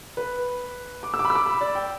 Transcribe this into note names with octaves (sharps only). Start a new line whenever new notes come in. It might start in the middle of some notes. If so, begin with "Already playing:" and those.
B4
D6
E6
D6
B5
E6
D6
B5
D5
G5